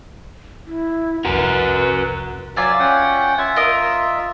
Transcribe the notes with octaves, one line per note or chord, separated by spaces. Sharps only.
E4
C2 F2 F#4 A#4 B4
F#3 F4 D5 E5 G#5
C#4 F#5 G5
F4 E5 G#5
A#4 D#5 D#6